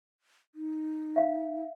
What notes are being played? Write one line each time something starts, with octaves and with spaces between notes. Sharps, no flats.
D#4
E5 F5